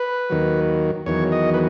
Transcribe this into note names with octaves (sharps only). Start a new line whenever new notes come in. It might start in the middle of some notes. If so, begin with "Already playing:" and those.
Already playing: B4
D#2 D#3 F#3
E2 D#3 F#3 C#5
D#5
B4